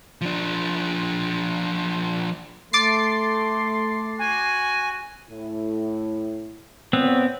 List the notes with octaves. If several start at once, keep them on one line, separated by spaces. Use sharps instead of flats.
F3 D4
A3 C6 D6 A6 C7
F#4 G#5
A2 E4
A#2 B3 C4 C#5